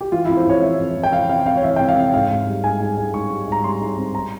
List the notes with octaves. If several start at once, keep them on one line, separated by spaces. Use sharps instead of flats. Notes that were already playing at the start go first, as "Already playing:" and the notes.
G4
E3 F4
F2 E4
C5
F2 C#5
E3 E5
F2
F2
G5
E3 F5
C3 F5
C3 F5
C#5
E3 E5
F2 G5
F5
C3
G#2 F5
G#2
G3
G#2 G#5
G#2
G#2
G#2 C#6
G3
G#2 A#5
G3 C6
G#2
C4
A#5